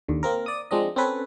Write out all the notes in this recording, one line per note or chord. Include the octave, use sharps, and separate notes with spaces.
D#2 D3
A#3 C4 A#4
D5 D#6
F3 G#3 C4 D4 D#5
C4 C#4 A4 B4 C#5